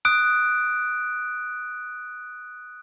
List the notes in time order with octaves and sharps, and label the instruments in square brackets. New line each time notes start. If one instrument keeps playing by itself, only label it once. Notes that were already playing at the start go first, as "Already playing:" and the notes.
[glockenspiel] D#6 F#6 D7